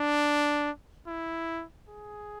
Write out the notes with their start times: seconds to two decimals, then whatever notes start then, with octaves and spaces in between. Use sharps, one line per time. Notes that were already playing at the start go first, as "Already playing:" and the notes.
Already playing: D4
1.07 E4
1.89 G#4